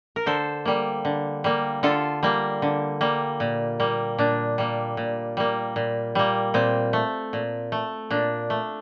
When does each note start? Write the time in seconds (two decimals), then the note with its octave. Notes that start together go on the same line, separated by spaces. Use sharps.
0.16 A#4
0.26 D3 A4 C5
0.65 G3 A#3
1.05 D3
1.44 G3 A#3
1.83 D3 F4 A4
2.23 G3 A#3
2.62 D3
3.01 G3 A#3
3.40 A#2
3.80 G3 A#3
4.18 A#2 D4
4.58 G3 A#3
4.97 A#2
5.37 G3 A#3
5.76 A#2
6.15 G3 A#3
6.54 A#2 C4
6.93 A3
7.33 A#2
7.72 A3
8.10 A#2 D4
8.50 A3